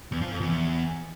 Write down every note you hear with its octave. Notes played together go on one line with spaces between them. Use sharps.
E2
F3
F2
E2